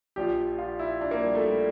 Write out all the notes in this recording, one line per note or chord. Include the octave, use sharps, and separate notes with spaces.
A#1 A#2 F3 G4
F4
E4
D4
A#3
G3
A3
G3